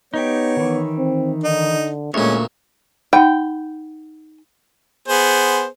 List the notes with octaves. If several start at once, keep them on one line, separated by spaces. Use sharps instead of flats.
B3 D#4 G4 C#5
D#3 E3
C4
D3 D#4
D2 A#2 G#3 C#4 C#5
D#4 F#5 G5 B5
B3 G#4 C5